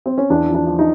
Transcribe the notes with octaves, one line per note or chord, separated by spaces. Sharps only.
C4
C#4
E2 D4
F3
D4
F3
D#4